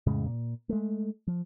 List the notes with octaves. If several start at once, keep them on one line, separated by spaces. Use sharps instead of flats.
F2 A2 C#3 G#3
A#2
G#3 A3
F3